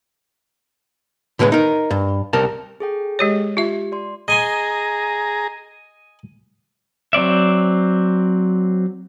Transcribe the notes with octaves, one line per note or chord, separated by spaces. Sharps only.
A2 D3 G#3 A#4 B4
D#4 A#4
G2
C2 A#4 A5
G#4 A4 G5
G#3 G4 C#5
F4 G4 E5
D5 C6
G#4 D#5 G#5 A#5 C6
F#3 C4 D5 E5